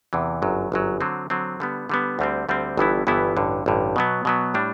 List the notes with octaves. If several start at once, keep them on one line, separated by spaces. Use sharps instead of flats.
E2 C3 E3
G1 F#2 F#3
G1 F#2 F#3
D3 F#3 C4
D3 F#3 C4
D3 G3 B3
D3 G3 B3
D2 D3 G3 C4
D2 D3 G3 C4
G1 G2 E3 B3 E4
G1 G2 E3 B3 E4
A1 G2 D3
A1 G2 D3
B2 F#3 B3
B2 F#3 B3
A2 G3 D4